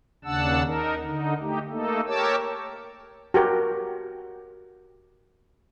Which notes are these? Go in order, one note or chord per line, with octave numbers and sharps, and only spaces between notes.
D#2 C#3 D4 F#5 A5 E6
D#4 A#4
D3 D#4
A3 D#4 G4
A3 A#3 D#4 A4
G4 A#4 C#5 A5 D6 E6
F#4 G4 A#4